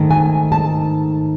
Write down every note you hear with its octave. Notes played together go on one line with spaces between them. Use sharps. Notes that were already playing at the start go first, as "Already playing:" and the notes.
Already playing: G#2 D#3 A3
G#5
A5